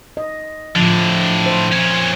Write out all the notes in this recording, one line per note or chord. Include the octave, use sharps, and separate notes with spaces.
D#5
A2 D3 F3
C5
A#2 C#4